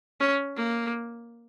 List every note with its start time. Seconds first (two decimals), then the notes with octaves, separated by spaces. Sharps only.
0.20 C#4
0.56 A#3